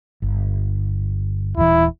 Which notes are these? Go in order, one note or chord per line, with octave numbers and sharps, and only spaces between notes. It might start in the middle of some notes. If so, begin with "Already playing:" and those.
G1
D#1 E3 E4